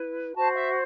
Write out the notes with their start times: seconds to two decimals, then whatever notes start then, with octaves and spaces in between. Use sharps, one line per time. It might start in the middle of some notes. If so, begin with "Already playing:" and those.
Already playing: E4 B4
0.35 F#4 C5 A5
0.55 E5